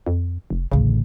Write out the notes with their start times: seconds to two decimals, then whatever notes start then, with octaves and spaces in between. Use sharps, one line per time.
0.07 F2
0.50 F1
0.72 A1 D2 C#3